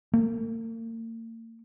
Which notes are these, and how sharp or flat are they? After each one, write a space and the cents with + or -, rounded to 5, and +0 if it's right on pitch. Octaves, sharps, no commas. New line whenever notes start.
A#3 -40